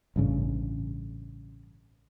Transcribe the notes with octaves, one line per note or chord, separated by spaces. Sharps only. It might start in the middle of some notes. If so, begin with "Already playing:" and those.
A1 G2 C#3